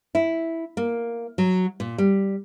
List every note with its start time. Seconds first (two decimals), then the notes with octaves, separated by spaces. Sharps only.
0.15 E4
0.77 A#3
1.38 F#3
1.80 A#2
1.98 G3